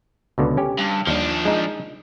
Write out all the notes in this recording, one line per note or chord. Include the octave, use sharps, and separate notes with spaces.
C#2 B2 D3
C#4 G4
G2
D#2 F3 D4
G#3 D#4